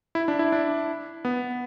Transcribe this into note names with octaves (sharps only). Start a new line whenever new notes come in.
E4
D4
E4
D4
B3